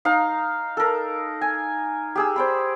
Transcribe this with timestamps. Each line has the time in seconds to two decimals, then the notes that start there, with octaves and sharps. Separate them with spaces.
0.05 D#4 F5 A#5
0.77 A4 A#4
1.41 G#5
2.15 G4 G#4 E6
2.36 C5 D5 B5